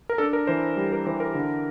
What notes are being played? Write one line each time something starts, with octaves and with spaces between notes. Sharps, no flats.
A#4
D4 A4
A#4
E3 C5
G3
A#4
E3 C5
A#4
D3